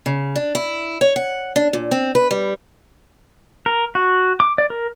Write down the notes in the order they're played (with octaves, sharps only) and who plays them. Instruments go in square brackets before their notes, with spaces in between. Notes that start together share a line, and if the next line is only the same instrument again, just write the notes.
[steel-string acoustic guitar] C#3
D4
E4
C#5
F#5
D4
A#2
C4
B4
G3
[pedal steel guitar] A#4
F#4
D6
D5
A#4